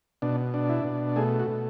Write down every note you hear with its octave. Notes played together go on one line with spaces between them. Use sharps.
B2 D4
D4
E4
B2
A3 G#4
F#4
B2